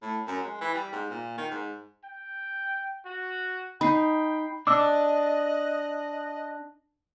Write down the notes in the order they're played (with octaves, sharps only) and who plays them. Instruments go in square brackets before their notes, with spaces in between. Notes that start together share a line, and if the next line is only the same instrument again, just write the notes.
[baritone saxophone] A2
F#2
G#3
E3
G3
G#2
A#2
D#3
G#2
[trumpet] G5
F#4
[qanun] D#4 [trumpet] G5 [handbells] B5 C7
[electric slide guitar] D4 [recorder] D#5 [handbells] D6 E6 [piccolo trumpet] F#6